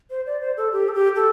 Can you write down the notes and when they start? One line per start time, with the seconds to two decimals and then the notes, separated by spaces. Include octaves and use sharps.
0.10 C5
0.26 D5
0.41 C5
0.57 A4
0.72 G4
0.89 A4
0.94 G4
1.16 A4